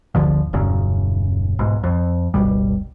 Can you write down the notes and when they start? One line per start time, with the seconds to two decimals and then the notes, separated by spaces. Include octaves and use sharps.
0.15 G1 D2 D3 F3
0.53 D#1 F#2 C#3
1.59 B1 G#2
1.84 F2
2.34 F#1 C#2 B2 G3